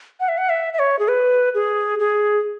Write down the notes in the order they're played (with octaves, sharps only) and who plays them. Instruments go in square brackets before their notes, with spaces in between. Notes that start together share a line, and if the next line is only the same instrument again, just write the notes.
[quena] F#5
E5
F#5
E5
E5
C#5
G#4
B4
G#4
G#4